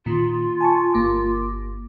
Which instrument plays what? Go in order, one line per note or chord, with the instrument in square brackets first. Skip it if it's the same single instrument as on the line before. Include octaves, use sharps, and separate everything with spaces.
[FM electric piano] A#2 D#3 [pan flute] F4
[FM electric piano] G#5 A5 C#6
G1 A#3 D6